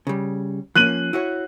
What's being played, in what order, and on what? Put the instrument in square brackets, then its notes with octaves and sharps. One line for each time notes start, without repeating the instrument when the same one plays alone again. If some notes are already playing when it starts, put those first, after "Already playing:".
[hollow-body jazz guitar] C#3 G3
[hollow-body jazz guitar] F3 A#3 C#4 [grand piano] F#6 D#7 F#7
[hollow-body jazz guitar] E4 F#4 C#5